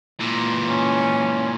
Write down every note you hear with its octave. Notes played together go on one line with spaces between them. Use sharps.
A#2 E3
C#4